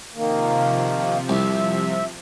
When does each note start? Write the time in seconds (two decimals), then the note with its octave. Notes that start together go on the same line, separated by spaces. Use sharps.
0.15 C3 D#3 F3 A#3
1.29 C2 E5